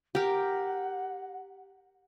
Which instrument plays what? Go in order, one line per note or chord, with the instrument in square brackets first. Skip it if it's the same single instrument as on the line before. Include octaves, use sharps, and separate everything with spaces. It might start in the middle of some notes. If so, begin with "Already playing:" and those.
[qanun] G4 A#4 [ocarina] F#5